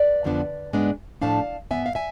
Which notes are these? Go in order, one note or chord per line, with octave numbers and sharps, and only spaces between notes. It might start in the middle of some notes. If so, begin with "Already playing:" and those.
Already playing: B4 D5
F2 D3 F3 B3 D4
G#2 G#3 B3 D4
A2 F3 A3 D4 F5 A5
G#2 G#3 B3 E5 G#5
F5
E5 G#5